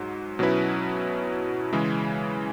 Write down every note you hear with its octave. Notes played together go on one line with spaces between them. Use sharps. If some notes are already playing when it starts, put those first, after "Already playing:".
Already playing: G#2 F#3
B2 F#3 C#4 E4 B4
C#3 E3 G#3